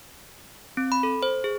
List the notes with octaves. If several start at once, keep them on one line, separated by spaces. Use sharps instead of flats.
C4
B5
A4
C5
G#4